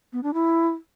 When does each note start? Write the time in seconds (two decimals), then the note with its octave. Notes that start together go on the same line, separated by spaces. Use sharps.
0.13 B3
0.23 D4
0.34 E4